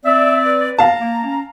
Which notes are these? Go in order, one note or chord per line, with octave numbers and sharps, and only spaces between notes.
C4 D5 E5
B4
F5 A5 A#5
A#3
C#4